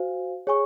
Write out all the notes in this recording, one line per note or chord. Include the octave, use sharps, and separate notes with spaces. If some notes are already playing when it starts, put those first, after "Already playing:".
Already playing: F#4 C5 F5 G#5
G#4 C#5 G#5 C#6